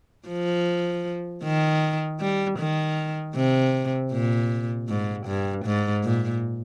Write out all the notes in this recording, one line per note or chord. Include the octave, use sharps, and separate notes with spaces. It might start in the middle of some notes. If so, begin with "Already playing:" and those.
F3
D#3
G3
D#3
C3
A#2
G#2
G2
G#2
A#2